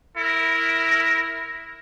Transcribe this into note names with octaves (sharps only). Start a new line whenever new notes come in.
E4 A#4